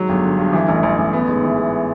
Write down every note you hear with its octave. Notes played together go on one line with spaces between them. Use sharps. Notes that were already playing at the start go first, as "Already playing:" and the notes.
Already playing: G#2 F#3
G1
D3
G2
E3
A1
A1
A1
B3
G#2
E3
B3